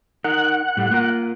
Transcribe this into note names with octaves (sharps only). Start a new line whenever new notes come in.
D#4 A#4 F#5
A2 G3 A3
A#3 F4 A#4